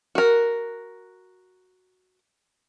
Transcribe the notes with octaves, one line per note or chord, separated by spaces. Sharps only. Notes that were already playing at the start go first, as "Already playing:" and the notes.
F#4 A#4